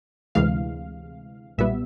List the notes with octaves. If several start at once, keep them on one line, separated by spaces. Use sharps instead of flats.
D2 C3 E3 G#3 F5
B1 A#2 G3 B3 E5